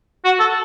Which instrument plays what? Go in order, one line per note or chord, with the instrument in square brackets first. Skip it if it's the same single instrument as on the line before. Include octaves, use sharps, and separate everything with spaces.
[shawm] F#4
A4